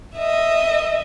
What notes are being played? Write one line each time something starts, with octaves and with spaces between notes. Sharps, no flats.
D#5 E5